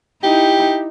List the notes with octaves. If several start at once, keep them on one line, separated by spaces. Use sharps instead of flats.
D#4 E4 G4